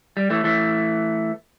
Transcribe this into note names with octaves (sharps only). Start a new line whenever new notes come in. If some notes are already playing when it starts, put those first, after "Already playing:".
G3
E3 A3
E3 A3